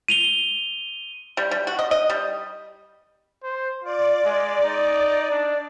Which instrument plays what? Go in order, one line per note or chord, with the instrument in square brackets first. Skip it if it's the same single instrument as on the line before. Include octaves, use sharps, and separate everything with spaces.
[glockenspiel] D#7 F7 G7
[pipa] G3
G3
F#4
D#5
D#5
G3
[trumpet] C5
[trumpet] F4 [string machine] D5
[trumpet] G#3
D#4
D4